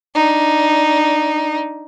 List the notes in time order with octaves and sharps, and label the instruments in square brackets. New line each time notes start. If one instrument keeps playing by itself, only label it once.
[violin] D4 D#4